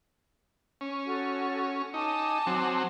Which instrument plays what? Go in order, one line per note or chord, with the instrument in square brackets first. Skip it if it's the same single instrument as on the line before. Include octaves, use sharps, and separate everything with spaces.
[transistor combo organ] C#4
[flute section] F#4 A4
[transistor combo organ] D#4 [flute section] G#5 A5 D6
[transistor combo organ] F#3 C4